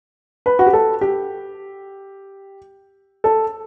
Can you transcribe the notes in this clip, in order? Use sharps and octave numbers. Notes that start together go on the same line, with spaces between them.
B4
F#4
G4
A4
G4
A4